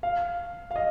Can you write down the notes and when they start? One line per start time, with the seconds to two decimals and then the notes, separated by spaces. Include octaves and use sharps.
0.03 F5
0.71 F5
0.76 D#5